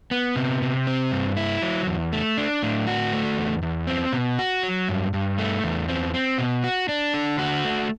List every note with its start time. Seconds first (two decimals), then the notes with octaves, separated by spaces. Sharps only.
0.11 B3
0.36 C3
0.62 C3
0.87 C4
1.12 G2
1.37 E4
1.62 F#3
1.87 E2
2.13 A3
2.37 D4
2.63 A2
2.87 F#4
3.13 A3
3.37 E2
3.63 E2
3.87 C4
4.13 B2
4.39 F#4
4.63 F#3
4.89 G2
5.14 G2
5.38 A3
5.64 E2
5.89 C4
6.14 C4
6.38 B2
6.64 F#4
6.89 D4
7.14 D3
7.39 F#4
7.65 A3